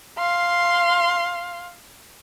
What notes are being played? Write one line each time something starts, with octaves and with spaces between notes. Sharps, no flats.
F5 C6